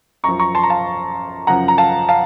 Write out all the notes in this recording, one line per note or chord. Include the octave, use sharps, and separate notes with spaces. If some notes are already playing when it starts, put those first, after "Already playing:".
F#2 F3 A#5 C#6
A#5 C#6
A5 C6
A#5
F5 A5
F#2 C#3 F3 F#5 A#5
A#5
F5 A5
F5 A5